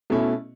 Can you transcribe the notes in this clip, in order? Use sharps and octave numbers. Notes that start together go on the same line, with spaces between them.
B2 A3 C#4 E4